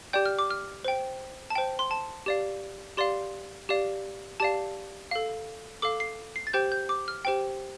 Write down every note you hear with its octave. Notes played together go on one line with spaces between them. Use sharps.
G4 D5 G5 G6
F6
D6
F6
C5 G5
A5
C5 G5
C6
A5
G4 D5 F5
G4 D5 F5 C6
G4 D5 F5
G4 D5 F5 A5
A4 F5
A4 F5 D6
C7
C7
A6
G4 C5 G5 G6
G6
D6
F6
G4 C5 G5